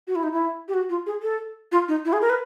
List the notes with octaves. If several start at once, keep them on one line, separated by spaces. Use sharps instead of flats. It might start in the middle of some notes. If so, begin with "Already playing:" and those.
F#4
E4
D#4
E4
G4
F#4
F4
G#4
A4
F4
D#4
E4
G#4
A#4
B4